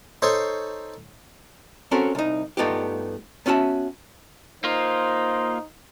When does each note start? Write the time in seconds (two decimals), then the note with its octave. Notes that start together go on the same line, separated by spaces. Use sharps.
0.22 D#4 A4 C5 C#5 C6
1.91 C4 C#4 F#4 A4 A#4
2.15 C2 D#4
2.57 G2 A3 B3 D#4 F4 G4
3.46 B3 C#4 F#4 E5 A5
4.64 A#3 D#4 F4 C5